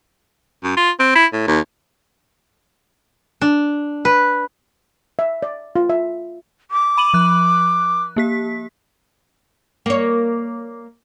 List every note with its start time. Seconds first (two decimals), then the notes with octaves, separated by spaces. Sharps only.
0.63 F#2
0.77 F4
1.00 C4
1.15 E4
1.33 A2
1.47 D#2
3.41 D4
4.05 B4
5.19 E5
5.43 D5
5.76 F4
5.90 E5
6.71 D6
6.97 B5 D#7 F#7
7.14 F3 F#6
8.16 A#3 G4 B6
9.86 A#3 C#5